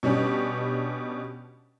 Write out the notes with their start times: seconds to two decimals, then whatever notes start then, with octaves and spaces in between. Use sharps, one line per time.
0.03 B2 G3 C#4 D4 G4